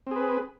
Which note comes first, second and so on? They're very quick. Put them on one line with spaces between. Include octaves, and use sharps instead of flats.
C4 G#4 B4